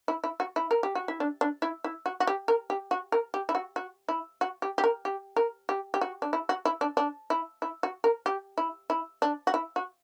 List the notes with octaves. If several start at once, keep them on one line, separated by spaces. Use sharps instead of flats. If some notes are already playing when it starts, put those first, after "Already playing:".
E4
E4
F#4
E4
A#4
G4
F#4
E4
D4
D4
E4
E4
F#4
F#4
G4
A#4
G4
F#4
A#4
G4
E4
F#4
F#4
E4
F#4
G4
G4
A#4
G4
A#4
G4
G4
F#4
D4
E4
F#4
E4
D4
D4
E4
E4
F#4
A#4
G4
E4
E4
D4
F#4
E4
F#4